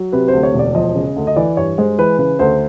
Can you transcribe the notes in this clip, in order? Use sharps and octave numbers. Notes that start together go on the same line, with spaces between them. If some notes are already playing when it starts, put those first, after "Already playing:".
Already playing: F#3
C3 B4
D2 C5
C#5
E1
D5
F3 D#5
C#3
D2
D#5
E3 D5
G2 C#5
G#3 C5
E3 B4
C#3 B4
D2 C5